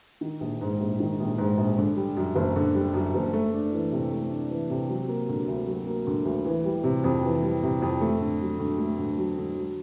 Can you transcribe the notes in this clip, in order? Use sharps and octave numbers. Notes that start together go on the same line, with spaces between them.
D#3
A#1
G#2
A#1
D#3
A#1
G#2
A#1
D3
G3
F#2
F#1
D3
G3
F#2
F#1
A3
D4
E3
C3
A3
D4
E3
C3
F#3
A#3
D3
D2
F#3
A#3
D3
D2
E3
G3
C3
F2
E3
G3
C3
F2
A3
D3
F#3
D3
A3
D3
F#3
D3
F#3